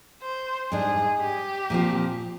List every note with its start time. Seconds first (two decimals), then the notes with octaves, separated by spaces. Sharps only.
0.22 C5
0.71 G#2 G3 D4 G#4
1.21 G4
1.70 A#2 F3 C4